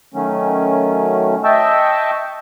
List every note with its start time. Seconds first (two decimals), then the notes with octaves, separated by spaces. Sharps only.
0.14 D#3 F#3 A3 C#4
1.44 D#5 E5 G5 A5 C#6 E6